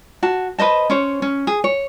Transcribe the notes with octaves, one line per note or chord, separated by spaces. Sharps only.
F#4 A5
B4 C5 D#5 A5
C#4 C5 C#5
C#4
G#4
C#5